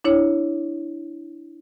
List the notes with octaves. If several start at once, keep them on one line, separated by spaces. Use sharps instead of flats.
D4 E4 C#5